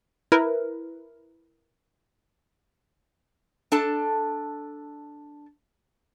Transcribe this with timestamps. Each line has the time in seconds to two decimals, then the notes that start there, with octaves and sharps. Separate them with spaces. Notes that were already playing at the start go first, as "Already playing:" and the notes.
0.32 E4 A#4 B4
3.72 D4 A4 A5